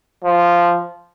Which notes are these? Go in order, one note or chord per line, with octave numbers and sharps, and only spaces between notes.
F3